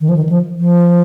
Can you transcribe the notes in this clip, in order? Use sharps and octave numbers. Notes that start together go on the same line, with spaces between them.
D#3
F3
D#3
F3
F3